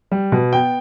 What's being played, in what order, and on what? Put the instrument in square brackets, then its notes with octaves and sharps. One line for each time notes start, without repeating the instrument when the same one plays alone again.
[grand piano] G3
B2
B3 G5